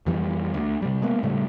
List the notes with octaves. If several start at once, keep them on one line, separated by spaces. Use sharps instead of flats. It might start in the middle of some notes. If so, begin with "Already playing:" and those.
F2 E3 G3
D2
C3 G3
G#3 A#3 B3
A2 C#3 G3 A3